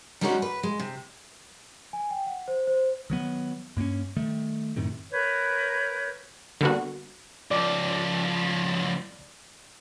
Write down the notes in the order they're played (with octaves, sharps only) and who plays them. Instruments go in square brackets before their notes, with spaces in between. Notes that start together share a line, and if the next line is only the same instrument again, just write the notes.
[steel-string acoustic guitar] G3 G#3 C#4 D#4 F4 F#4
B4
G#3
C3
[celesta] G#5
G5
F#5
C5
C5
[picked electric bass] D#3 F#3 B3
G2 A#3 C4 C#4
D#3 G3 A3
F#2 A2 C3 D#3
[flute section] A#4 B4 C#5 G6
[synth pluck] D3 G3 A#3 B3 F#4
[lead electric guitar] C#2 F3 [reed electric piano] D5 D6